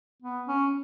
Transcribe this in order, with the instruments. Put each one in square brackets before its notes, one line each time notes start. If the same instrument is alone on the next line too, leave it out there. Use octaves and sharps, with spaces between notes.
[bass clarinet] B3
C#4